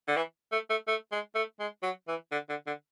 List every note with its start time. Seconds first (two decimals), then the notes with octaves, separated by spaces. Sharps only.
0.08 D3
0.16 E3
0.52 A3
0.70 A3
0.88 A3
1.12 G#3
1.35 A3
1.59 G#3
1.83 F#3
2.08 E3
2.32 D3
2.49 D3
2.67 D3